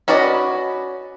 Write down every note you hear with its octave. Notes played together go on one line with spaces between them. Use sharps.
C#4 F#4 B4 D5 D#5